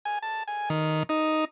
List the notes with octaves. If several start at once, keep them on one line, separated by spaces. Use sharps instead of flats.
G#5
A5
G#5
D#3
D#4